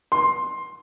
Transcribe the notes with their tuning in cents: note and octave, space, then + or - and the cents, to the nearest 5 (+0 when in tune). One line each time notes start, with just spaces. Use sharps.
C6 +15